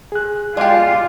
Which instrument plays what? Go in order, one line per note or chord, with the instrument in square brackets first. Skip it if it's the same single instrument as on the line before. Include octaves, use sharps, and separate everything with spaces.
[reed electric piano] G#4 F#6
[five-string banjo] G#3 G4 [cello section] F4 [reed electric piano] D5 G#5 D6